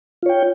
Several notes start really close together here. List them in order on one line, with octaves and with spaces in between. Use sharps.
F4 C#5 G5